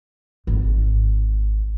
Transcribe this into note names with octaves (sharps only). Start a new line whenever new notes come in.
G#1